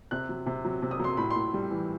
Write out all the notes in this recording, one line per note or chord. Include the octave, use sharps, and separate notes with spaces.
C3 F#6
F#3
C3
F#3
C3
D#6
F#3 C6
A2 B5
C6
A2
G3
E3